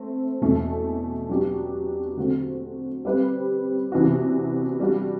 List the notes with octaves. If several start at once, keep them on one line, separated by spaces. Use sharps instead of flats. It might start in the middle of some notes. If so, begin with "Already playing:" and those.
Already playing: A3 C4 C5
E2 B2 A3
F#3 B3 D4 G4
D3 A3 C4 F#4
G3 C4 G4 B4
C3 E3 B3 D4 F#4
G3 D4 F#4